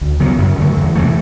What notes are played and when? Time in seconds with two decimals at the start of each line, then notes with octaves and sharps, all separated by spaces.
0.01 D2
0.20 C#3 F#3 B3
0.38 F#2
0.58 D3 F#3 A3
0.76 E2
0.95 C3 E3 A3